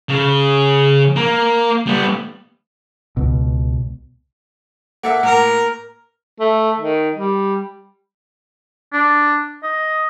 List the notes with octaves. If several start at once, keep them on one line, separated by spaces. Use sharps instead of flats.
C#3
A#3
G3 B3
C#2 B2
A#3 A4 E5 F#5
A2 A#3 A#4
A3
D#3
G3
D4
D#5